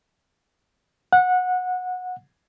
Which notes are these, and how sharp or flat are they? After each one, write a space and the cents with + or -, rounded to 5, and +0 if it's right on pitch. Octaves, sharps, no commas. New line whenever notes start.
F#5 -20